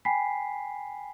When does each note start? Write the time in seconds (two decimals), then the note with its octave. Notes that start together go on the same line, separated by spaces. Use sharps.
0.05 G5 G#5 B5 B6 C7